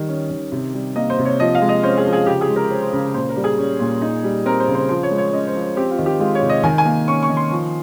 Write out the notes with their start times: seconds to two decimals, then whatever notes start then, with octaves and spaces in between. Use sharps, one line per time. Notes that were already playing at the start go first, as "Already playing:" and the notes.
Already playing: D#3 G3
0.09 C#4
0.31 D#3
0.52 C3
0.74 G3
0.96 A#3 D#5
1.10 C5
1.18 C3
1.25 C#5
1.40 F3 D#5
1.55 F5
1.61 G#3
1.69 D#5
1.83 C#4 C5
1.97 G#4
2.06 F3
2.13 G#4
2.27 C#3 G4
2.41 G#4
2.49 G#3
2.56 A#4
2.70 C#4 C5
2.83 C5
2.93 C#3 A#4
3.14 A#2 C5
3.29 A#4
3.36 G3
3.44 G#4
3.58 C#4
3.80 A#2
4.02 D#4
4.23 G3
4.45 C4 A#4
4.60 C5
4.68 C#3
4.75 C5
4.89 F3 C5
5.03 C#5
5.11 G#3
5.18 C#5
5.32 C#4 D#5
5.48 C5
5.55 F3
5.62 C5
5.76 C4 G4
5.91 F4
5.98 D#3
6.06 G4
6.20 G#3 F4
6.35 C#5
6.42 C3
6.49 D#5
6.63 D#3 G#5
6.78 G#5
6.85 A#3
7.08 C#4 C#6
7.23 C#6
7.30 D#3
7.37 C6
7.51 F3